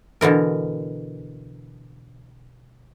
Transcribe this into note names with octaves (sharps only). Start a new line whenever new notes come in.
B2 D3 E3 A#4